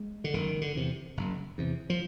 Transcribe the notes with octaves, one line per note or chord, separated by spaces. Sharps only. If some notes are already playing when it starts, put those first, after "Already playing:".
Already playing: G#3
D3
F#1 D#3
D3
E2 C3
F#1
E2 C3
F3